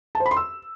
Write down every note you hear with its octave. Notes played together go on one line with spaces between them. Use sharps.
A5
C5
B5
C6
E6